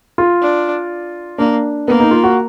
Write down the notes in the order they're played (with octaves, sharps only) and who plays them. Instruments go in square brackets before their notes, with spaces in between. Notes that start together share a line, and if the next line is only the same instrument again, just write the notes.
[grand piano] F4
[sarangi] D4
[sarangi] A#3 [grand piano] D4
[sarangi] A#3 [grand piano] B3
[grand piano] D#4
F4
F#4